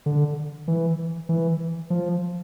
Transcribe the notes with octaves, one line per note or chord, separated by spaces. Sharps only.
D3
E3
E3
F3